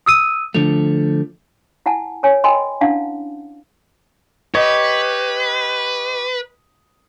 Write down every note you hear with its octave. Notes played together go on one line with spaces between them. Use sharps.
D#6 E6 D#7
D3 F3 A3 F7
E4 F#5 G#5 A5
A#4 C#5 G#5
A#4 D#5 G5 G#5 B5 C6
C#4 D4 E4 F5 F#5 A5
G4 B4 C#5 D#5